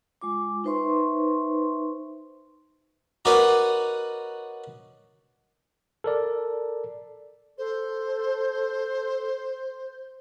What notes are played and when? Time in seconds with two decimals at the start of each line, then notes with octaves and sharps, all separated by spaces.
0.21 G#3 F4 D6
0.64 D#4 B4 C5 E5 C6 C#6
3.25 D#4 F#4 A#4 B4 C#5 D5
6.04 A4 A#4 D5
7.58 A4 C5